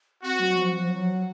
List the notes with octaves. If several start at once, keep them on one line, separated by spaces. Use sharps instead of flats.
C4 F#4
F#3
F3
F3
F#3